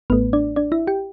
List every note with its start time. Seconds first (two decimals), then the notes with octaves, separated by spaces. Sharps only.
0.10 A1 A2 A3 B3 B4
0.33 D4 D5
0.56 D4 D5
0.72 E4 E5
0.87 G4 G5